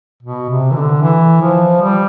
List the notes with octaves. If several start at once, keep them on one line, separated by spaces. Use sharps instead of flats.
B2
C3
E3
D3
E3
F3
G3